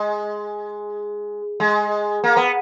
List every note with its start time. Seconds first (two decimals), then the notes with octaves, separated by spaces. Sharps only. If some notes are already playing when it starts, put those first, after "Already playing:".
Already playing: G#3
1.60 G#3
2.24 A#3
2.37 B3